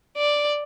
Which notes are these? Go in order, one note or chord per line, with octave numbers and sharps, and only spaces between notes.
D5